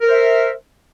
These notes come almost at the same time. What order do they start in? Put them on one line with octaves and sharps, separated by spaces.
A#4 C5 E5